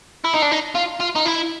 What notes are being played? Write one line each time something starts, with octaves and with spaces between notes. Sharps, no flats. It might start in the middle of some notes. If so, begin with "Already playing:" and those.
E4
D#4
D4
D#4
F4
F4
D#4
E4